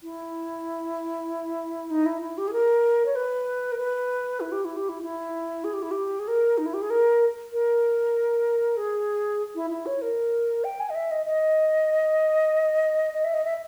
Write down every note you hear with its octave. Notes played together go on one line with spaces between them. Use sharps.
E4
D#4
E4
E4
G4
G#4
A#4
C#5
B4
A#4
B4
E4
G4
E4
G4
E4
E4
G#4
G4
E4
G4
G#4
A#4
D#4
E4
G4
G#4
A#4
A#4
G#4
E4
E4
C#5
A#4
G5
G#5
D#5
E5
D#5
D#5
D#5
E5
D#5
E5